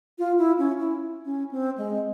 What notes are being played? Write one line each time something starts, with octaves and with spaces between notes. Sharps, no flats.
F4
E4
C#4
E4
C#4
C4
G#3